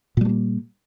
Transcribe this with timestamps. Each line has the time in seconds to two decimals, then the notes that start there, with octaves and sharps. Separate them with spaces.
0.17 A#2
0.21 G3
0.25 A3
0.29 A#3